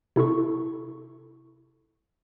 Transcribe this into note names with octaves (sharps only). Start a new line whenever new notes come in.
C3 E4 A4 C#6